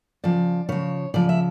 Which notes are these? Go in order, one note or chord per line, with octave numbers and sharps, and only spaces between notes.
C#3 F3 D5
C#3 F3 C#5
C#3 F3 D5
E5